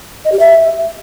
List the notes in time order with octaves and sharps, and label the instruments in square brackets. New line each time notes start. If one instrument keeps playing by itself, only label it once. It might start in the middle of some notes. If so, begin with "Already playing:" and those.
[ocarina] D#5
G4
E5